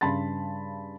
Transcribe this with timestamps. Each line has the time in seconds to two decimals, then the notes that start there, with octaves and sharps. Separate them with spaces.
0.01 G2 C#3 A5 B5 C6 A6